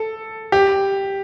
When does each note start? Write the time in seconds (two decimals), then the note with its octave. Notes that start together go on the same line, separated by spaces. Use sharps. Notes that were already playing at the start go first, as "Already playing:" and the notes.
Already playing: A4
0.52 G4